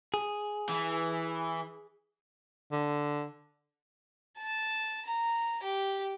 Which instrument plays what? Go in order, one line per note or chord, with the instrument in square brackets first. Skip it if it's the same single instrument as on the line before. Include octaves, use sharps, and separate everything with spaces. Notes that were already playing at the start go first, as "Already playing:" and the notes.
[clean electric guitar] G#4
[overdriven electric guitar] E3
[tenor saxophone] D3
[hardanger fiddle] A5
A#5
G4